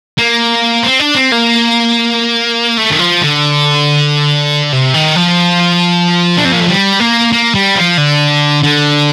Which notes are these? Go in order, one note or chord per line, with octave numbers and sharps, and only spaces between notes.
A#3
C4
D4
C4
A#3
A3
D#3
F3
D3
C3
D#3
F3
D4
C4
A#3
A3
G3
A#3
A#3
G3
F3
D3
D3